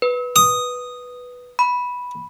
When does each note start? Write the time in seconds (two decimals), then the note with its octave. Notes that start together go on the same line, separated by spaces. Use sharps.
0.02 B4
0.36 D#6
1.59 B5